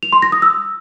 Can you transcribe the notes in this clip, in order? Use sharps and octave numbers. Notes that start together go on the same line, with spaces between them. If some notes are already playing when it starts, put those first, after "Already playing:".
F7
C6
A#6
D#6
E6